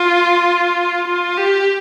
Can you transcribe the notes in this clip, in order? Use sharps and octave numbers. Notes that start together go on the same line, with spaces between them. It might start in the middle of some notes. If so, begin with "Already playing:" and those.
Already playing: F4
F4
G4